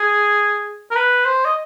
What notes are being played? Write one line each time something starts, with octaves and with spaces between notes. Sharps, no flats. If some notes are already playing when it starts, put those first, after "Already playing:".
Already playing: G#4
A#4
B4
C5
D#5